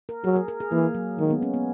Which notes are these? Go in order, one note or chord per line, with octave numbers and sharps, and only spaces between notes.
A#4
F#3 G#4
A#4
A#4
G#4
E3 A#3
F#3
D#3 G#3
B3
C#4
B3